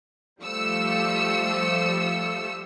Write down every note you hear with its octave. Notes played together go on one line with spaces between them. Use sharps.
F3 G3 A3 F5 E6 C#7